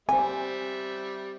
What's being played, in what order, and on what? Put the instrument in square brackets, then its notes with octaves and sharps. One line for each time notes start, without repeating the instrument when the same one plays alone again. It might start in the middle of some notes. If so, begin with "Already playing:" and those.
[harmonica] G3 E5 [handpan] C4 C5 [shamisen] G#5